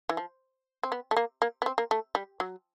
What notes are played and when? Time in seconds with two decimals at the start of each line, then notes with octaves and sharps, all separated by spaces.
0.09 E3
0.17 F3
0.83 C4
0.92 B3
1.11 A3
1.17 A#3
1.42 A#3
1.62 B3
1.66 C4
1.78 A#3
1.91 A3
2.15 G3
2.40 F#3